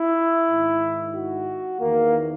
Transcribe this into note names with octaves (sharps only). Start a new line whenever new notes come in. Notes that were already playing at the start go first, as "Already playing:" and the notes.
Already playing: E4
G#2 D#3
F#4
E2 D#3 A#3